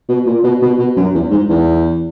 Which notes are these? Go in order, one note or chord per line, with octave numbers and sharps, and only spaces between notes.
B2
A#2
B2
B2
B2
F#2
E2
G#2
E2